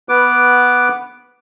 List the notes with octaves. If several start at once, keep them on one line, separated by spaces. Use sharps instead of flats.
B3 B4 D6